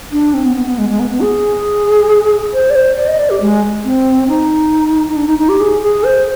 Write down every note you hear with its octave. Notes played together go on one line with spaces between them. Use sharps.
D4
C4
B3
B3
B3
G#3
G#3
B3
B3
G#4
C5
D5
C5
D5
D#5
D5
G4
G#3
C4
D#4
D#4
D4
D#4
D#4
G4
G#4
G#4
C5